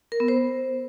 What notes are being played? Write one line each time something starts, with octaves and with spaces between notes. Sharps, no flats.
A#4
B3
C5